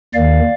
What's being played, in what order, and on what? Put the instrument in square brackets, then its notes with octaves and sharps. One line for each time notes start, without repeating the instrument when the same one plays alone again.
[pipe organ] D#2 D#3 D5 F5